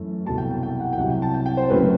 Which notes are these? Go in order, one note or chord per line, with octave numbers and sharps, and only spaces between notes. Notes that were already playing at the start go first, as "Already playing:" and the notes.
Already playing: F#2 E3 A3
C2 B2 F#3 A5
G5
G5
G5
F#5
G5
C2 C3 F#3 F#5
G5
A5
G5
G5
C5
F#1 F#2 F#3 A3 B4